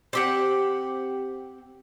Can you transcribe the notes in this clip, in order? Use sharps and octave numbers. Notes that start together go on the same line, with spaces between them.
C4 G4 F#5